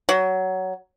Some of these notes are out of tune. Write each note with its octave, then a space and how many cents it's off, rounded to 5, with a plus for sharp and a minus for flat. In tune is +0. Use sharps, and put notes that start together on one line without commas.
F#3 +15